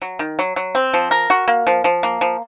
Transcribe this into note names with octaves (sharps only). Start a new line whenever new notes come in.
F#3
D#3
F#3
F#3
C4
F3
A#4
F#4
A#3
F3
F3
A#3
F3